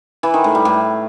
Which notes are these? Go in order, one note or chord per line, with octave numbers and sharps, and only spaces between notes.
E3
D#3
A2
G3
A2